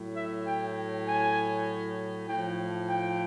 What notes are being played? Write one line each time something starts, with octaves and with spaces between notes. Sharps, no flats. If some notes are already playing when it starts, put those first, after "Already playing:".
Already playing: A2 F#3
E5
G5
G#5
A2 F3 G5
G5